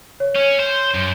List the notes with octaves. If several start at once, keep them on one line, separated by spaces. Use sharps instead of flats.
C#5
C#4
C5
F#2